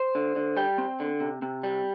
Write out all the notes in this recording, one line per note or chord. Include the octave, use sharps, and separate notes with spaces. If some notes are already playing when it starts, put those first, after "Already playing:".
Already playing: C5
D3
D3
G3 G5
C4
D3
C3
C3
G3